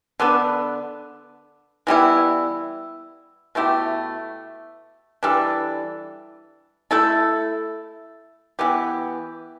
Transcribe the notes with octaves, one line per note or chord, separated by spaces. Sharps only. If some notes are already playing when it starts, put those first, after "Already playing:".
D3 B3 D4 B4
E3 G3 B3 E4
B2 A3 E4 G4
E3 G3 D4 A4
A3 E4 A4
E3 B3 G4